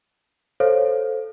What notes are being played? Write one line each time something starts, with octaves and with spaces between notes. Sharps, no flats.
A4 C5 C#5 F5